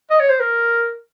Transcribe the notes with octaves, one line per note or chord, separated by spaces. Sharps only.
D#5
C#5
C5
A#4